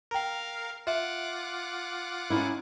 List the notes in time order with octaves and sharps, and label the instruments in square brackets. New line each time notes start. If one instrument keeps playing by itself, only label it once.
[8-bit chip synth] A#4 F5 [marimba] G5 A#5
[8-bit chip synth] F4 F#5 D6 [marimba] E5
[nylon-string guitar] C#4 D#4 E4